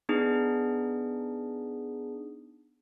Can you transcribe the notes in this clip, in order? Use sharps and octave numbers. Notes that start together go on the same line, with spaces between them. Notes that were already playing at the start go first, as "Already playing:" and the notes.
B3 D4 D#4 G#4